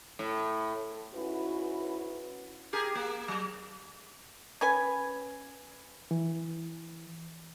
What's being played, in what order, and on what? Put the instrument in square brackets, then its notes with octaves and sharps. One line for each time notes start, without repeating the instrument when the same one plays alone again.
[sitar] A2
[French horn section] G#2 C#4 E4 F#4 B4
[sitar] G4 G#4 A#4
A#3
F#3
[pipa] C#4 B4 G#5
[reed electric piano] E3